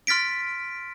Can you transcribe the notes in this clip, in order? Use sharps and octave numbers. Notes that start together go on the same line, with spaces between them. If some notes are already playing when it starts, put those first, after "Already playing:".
C6 F6 A6 B6 D7